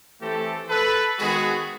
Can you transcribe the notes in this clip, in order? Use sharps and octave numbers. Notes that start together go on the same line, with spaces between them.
E3 A3 C4 G4 A4
A4 B4
D#3 G#3 B3 F#4 G#4